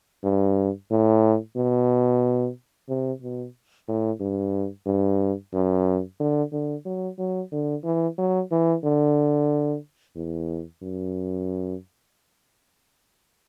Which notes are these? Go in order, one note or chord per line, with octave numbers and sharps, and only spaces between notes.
G2
A2
B2
C3
B2
A2
G2
G2
F#2
D3
D3
F#3
F#3
D3
E3
F#3
E3
D3
E2
F#2